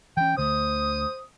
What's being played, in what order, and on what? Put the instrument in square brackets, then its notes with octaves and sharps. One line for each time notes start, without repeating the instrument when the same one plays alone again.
[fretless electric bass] E3 C#4 [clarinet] G5
[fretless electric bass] D2 D3 A3 [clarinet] C5 [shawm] D#6